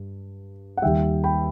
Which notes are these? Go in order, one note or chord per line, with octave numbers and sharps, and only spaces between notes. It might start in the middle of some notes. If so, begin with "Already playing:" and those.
Already playing: G2
F#5
D#2 D#3 G3 E5 G5
G5 B5